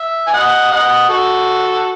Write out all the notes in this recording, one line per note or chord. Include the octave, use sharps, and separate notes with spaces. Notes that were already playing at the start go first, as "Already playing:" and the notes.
Already playing: E5
G#5
D#5 F#5
D#5 F#5
F#4 A4